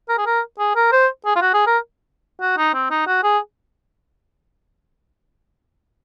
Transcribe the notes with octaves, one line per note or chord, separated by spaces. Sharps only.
A#4
G#4
A#4
G#4
A#4
C5
G#4
F4
F#4
G#4
A#4
F#4
D#4
C4
D#4
F#4
G#4